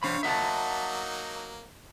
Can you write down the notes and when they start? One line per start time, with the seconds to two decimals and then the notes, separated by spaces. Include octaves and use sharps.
0.03 D4 C5 C#5 F5 B5
0.23 F#3 A#3 D#4 E5 F#5 A5